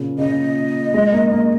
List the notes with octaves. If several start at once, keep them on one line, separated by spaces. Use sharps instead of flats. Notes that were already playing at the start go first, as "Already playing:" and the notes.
Already playing: A#2 C#3
C#3 D#5
G#3
A#3
A#3